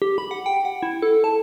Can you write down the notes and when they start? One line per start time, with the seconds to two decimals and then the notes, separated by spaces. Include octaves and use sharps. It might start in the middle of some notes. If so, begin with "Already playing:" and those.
0.02 G4
0.18 B5
0.31 F#5
0.46 G5
0.65 F#5
0.83 E4
1.02 A4
1.24 A5